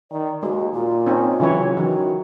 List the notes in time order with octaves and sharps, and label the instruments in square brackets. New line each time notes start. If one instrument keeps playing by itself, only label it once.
[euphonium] D#3 [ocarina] D5
[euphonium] D#2 [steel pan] G#3 [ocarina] F#4
[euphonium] A#2 [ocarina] F4
[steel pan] C4 C#4 D#4
[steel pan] C#3 F#3 C#5 [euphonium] E3
[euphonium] D#3 [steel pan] E3 [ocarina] F#4